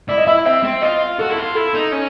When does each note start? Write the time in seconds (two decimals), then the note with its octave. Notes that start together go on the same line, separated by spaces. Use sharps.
0.09 E4 D5
0.18 D#5
0.27 E4 E5
0.45 C4 E5
0.64 C4
0.82 F4 D#5
1.19 F#4 A4
1.30 E4 A4
1.37 F4
1.55 E4 A4
1.74 D#4
1.92 C#4